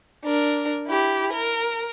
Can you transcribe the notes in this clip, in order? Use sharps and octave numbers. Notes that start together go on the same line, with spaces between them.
D4 A#4
E4 G4
A#4